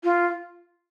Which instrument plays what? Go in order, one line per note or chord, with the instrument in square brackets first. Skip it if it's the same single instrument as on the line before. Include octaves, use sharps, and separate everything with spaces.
[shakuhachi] F4